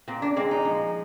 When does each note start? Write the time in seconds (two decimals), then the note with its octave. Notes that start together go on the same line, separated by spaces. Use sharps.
0.08 A#2 C4
0.22 D4
0.36 G#3 C4
0.51 D#4
0.65 F3